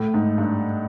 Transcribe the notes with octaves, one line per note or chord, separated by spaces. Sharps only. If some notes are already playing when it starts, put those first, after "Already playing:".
Already playing: A2
G#2
G2